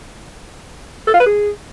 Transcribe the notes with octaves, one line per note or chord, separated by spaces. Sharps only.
A4
F4
B4
G#4